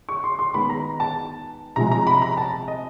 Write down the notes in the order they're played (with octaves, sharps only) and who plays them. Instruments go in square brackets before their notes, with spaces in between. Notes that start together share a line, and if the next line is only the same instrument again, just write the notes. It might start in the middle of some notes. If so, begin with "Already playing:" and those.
[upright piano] C#6
C6
C6
D#3 G#3 B3 D#4 B5
A#5
A5
C3 F3 G#3 A#5
A#5
B5
A#5
A5
D#5